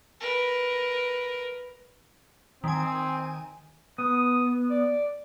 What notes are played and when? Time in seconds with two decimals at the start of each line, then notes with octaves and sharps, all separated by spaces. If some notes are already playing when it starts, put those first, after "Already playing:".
0.20 A#4 B4
2.64 D#3 C4 G#5
3.98 B3 D#6
4.70 D5